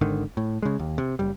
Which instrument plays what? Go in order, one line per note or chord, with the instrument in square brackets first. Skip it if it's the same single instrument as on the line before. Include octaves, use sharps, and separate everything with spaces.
[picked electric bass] G#1 G#2 D3 D#3
A2
C#3 G#3
D#2
C3
F#1 G3